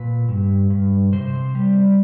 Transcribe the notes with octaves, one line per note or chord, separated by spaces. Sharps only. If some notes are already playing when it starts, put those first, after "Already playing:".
Already playing: A#2 B4
G2
G2
C3 C5
G3